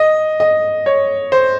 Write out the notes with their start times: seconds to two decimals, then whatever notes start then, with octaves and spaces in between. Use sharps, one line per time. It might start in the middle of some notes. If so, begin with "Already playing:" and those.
Already playing: D#5
0.40 D#5
0.86 C#5
1.32 C5